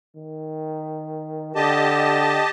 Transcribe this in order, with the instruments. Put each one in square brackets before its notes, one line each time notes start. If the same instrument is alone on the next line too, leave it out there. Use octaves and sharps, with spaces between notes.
[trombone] D#3
[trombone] D3 [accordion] G4 D#5 A5